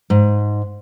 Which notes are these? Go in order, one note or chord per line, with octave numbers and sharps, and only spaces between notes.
G#2